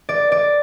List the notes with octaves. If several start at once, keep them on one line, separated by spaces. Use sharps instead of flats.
D5
D5